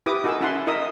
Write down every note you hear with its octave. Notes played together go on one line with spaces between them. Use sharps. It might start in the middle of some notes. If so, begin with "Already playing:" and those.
E4 G4 B4 D6 D#6
D#4 F#4 A4 A#4 G#5 E6
C#4 E4 E5 F#5 A5 C6
E4 A#4 D#5 E5 D#6